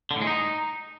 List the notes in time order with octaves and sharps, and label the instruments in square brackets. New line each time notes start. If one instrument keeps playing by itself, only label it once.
[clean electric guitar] D3
A2
G#3
D#4